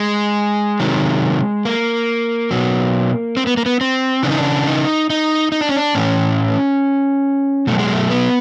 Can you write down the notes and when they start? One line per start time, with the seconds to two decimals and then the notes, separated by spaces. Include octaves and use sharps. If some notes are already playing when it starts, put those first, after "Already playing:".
Already playing: G#3
0.80 C3 D#3 F#3
1.65 A#3
2.51 B2 F#3
3.37 C4
3.47 B3
3.57 A#3
3.66 B3
3.81 C4
4.23 C#3 E3 D4
4.30 D#4
4.38 D4
4.67 D#4
5.10 D#4
5.52 D#4
5.61 D4
5.69 C#4
5.76 D4
5.95 A2 E3 C#4
7.67 B2 F#3 A3
7.79 G#3
7.92 A3
8.10 B3